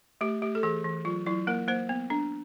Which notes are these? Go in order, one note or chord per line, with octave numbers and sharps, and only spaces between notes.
A3 G4
A3 G4
A4
E3 G#4
E3
F#3 F4
F#3 E4
A#3 A#4
A#3 C5
B3
D4